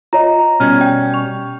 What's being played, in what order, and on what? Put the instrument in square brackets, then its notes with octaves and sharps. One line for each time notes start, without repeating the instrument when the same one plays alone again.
[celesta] F4 C#5 D#5 [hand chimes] A#5
[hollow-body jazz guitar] B2 G3 C#4 [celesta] F6 G#6
[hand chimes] G5
[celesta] C#6 F7